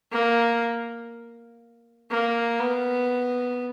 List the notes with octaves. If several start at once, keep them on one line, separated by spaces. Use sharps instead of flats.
A#3
A#3
B3